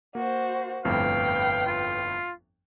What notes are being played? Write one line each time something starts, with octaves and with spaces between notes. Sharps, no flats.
A#3 F#4 C5
G1 F2 A2 B4 F5 G5
F4